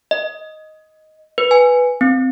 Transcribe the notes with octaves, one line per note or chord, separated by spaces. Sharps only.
D#5
B4
G#5
C4